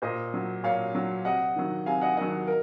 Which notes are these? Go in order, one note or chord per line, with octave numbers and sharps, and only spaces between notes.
A#2 C5 D#5
F#3
A#2 C#5 F5
F#3
C3 D#5 F#5
D#3 F#3
C3 F5 G#5
D#5 F#5
D#3 F#3 D#5 F#5
A#4